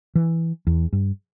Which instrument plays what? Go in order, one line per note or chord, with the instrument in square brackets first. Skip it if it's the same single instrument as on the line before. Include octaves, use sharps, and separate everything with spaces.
[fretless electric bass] E3
E2
G2